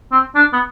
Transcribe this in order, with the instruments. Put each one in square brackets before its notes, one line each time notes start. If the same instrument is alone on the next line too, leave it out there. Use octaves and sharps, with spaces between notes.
[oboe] C4
D4
B3